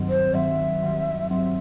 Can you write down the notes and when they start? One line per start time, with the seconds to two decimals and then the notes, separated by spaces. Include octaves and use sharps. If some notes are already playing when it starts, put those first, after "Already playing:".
Already playing: G2 D#3 F#3 C4
0.09 C5
0.34 G2 D#3 F#3 C4 E5
0.82 G2 D#3 F#3 C4
1.31 G2 D#3 F#3 C4 E5